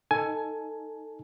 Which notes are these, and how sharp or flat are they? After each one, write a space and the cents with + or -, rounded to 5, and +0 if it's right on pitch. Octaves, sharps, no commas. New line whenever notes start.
D#4 -5 A4 +15 G#5 +15